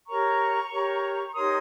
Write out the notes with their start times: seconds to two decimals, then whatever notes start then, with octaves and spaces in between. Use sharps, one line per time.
0.08 G4 A#4 C#5 A#5 C#6
0.71 G4 A#4 C#5
1.29 C#6
1.35 D#4 G4 A#4 C#5 C6 D#6